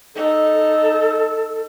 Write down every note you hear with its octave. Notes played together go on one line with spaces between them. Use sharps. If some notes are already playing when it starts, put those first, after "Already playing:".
D#4 A4